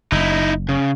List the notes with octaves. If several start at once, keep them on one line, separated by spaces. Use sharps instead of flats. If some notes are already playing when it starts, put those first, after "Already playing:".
F#1 D#4 E4
C#3